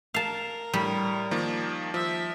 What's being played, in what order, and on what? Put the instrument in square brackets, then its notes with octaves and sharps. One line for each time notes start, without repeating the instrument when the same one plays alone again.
[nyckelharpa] A#4 [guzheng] F5 A5
[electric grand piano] A2 [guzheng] G3
[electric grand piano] D#3 F3 A#3
[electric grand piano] F3 [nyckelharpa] E5